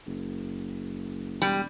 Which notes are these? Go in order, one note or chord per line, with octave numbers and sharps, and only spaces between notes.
F#1
E1 G3